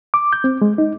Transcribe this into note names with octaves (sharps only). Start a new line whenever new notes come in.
D6
G6
C4
G#3
D#4